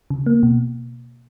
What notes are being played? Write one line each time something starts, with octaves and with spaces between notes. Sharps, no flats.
C#3
A#3
B2